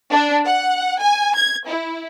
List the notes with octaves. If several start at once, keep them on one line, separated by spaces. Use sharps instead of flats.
D4
F#5
G#5
G#6
E4